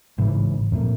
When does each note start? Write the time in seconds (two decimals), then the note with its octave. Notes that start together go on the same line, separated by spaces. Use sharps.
0.18 A1 G#2 C#3 E3
0.72 F2 A#2 A3 A#3